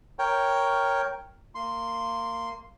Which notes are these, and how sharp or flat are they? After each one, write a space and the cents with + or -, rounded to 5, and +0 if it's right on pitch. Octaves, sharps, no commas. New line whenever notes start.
A#4 +0 C#5 +0 G5 +0
A#3 -20 C6 +0